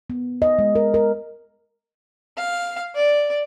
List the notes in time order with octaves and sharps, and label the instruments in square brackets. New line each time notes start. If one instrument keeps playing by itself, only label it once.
[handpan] B3
D#5
G#3
A#4
A#4
[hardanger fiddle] F5
D5